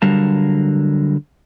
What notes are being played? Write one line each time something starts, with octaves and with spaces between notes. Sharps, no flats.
D3 F#3 G3 A#4 F5 A5